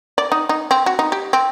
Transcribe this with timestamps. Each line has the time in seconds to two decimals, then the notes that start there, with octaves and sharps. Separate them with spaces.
0.18 D5
0.32 D#4
0.49 D#4
0.71 C4
0.86 F#4
0.99 D#4
1.12 G4
1.33 C4